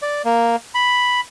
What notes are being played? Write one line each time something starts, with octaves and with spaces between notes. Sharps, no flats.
D5
A#3
B5